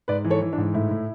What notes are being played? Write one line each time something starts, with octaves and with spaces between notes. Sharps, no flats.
G#2 B4 D5
E3
A4 C#5
E3
D4
G#2
A2 E4
A2